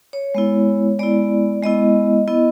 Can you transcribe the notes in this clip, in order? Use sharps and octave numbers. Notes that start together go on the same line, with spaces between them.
C#5
G#3 B3 E4
G#3 B3 E4 D5
G#3 B3 E4 D#5
B3 E4 D#5